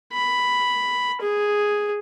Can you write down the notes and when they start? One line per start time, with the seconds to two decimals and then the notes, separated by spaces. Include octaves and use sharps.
0.13 B5
1.21 G#4